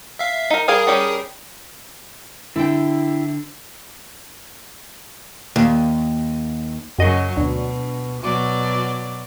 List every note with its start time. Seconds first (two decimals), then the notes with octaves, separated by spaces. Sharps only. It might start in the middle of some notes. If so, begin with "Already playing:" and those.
0.19 E5 F5
0.50 D#4 A#4
0.68 G3 G#4 A#4 F5 G#5 D#6
0.87 G3 C#4 G4
2.56 D3 E4 G5
5.56 D#2
6.99 F#2 C#3 F#3 D#5
7.37 D2 B2
8.22 B2 F#3 D5